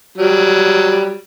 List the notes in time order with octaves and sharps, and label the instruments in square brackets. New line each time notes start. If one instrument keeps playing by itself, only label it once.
[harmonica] F#3 G3